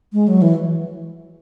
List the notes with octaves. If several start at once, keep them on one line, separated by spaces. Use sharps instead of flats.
G#3
F#3
E3